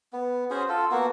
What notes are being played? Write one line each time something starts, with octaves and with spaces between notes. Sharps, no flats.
B3
C#4 F#4 G#4 C5
F4 A4
A#3 B3 F#4